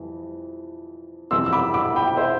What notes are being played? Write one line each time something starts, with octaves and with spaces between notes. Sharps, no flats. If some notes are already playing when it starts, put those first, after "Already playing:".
Already playing: F2 E3 G3
F2 C3 E3 G3 C6 E6
E6
B5 D6
B5 D6
G5 B5
C5 E5